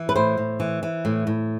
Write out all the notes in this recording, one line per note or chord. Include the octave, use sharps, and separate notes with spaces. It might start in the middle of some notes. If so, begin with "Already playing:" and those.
Already playing: E3
B4
A2 C5
A2
E3
E3
A2
A2